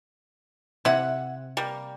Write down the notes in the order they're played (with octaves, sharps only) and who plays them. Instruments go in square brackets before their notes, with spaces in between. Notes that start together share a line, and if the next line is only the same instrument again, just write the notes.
[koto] C3 [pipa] E4 F#5
[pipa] G3 A#3